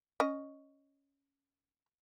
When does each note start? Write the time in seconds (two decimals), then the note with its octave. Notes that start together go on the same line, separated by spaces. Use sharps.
0.20 C#4 D#5